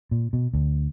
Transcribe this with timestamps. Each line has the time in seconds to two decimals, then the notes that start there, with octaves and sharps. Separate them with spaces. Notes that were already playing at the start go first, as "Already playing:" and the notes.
0.11 A#2
0.33 B2
0.54 D2